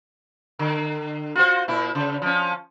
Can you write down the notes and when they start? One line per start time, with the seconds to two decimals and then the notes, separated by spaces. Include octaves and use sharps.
0.59 D3
1.35 F4 F#4 C5
1.68 A#2 E4
1.95 C#3
2.22 F3 C#4